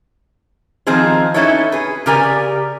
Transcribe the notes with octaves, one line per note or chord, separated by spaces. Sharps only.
D#3 F3 C4 D#4 G#4 C5
C#4 D#4 E4 A4 B4 C#5
G#4 B4
C#3 G4 A#4 D5 G#5